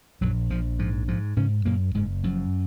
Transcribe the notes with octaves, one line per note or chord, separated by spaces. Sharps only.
A#1 F#2 F#3
A#1 F3
G#2 F3
G#2 F3
G#2 C#3 C#4
F#2 A#2 A#3
F#1 G#2 G#3
F#2 F3